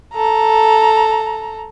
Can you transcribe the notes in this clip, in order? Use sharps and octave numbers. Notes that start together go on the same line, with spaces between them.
A4 A#5